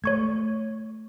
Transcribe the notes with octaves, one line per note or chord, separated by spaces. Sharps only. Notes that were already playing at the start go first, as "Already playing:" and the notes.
A3 C#5 C#6 G#6